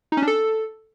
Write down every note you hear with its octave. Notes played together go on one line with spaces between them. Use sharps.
D#4
C#4
D4
A4